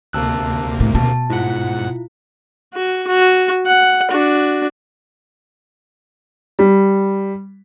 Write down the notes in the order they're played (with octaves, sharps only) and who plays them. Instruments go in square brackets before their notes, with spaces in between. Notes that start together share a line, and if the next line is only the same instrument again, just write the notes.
[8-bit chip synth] D2 C3 A#3 [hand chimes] A5 E6 F#6
[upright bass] A2
[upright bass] B2 [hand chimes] A5
[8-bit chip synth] G#2 F#5 [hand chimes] E4 F4
[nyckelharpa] F#4
F#4
F#5
D4 F#4
[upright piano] G3